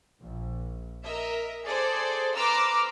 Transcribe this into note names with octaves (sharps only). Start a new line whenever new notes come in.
A#1
A#4 D#5 E5
G#4 A4 C5 D5
B4 A#5 C6 D6 E6 F6